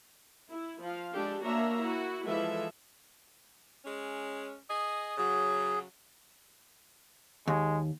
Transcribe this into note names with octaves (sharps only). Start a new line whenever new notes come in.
E4
F3 F5
G#3 D4 G4 A4
A#3 D4 F#4 C#5 E5 A#5
E4 F#4
E3 F3 G#3 A4 E5
G#3 C#4
G#4 D#5
C#3 F#3 G#4
D#2 G#3